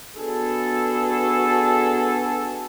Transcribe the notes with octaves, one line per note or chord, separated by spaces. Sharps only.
B3 D4 F#4 G#4 A4